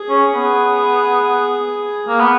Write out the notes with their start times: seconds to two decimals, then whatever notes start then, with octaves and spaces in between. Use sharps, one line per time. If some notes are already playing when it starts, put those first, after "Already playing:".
Already playing: G#4
0.09 C#4
0.31 B3
2.08 A#3
2.20 B3